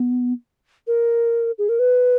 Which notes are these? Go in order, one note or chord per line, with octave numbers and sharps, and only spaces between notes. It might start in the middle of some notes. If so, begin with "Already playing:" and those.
Already playing: B3
A#4
G#4
A#4
B4